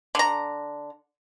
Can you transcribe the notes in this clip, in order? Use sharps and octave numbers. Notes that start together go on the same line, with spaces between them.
D3 A#5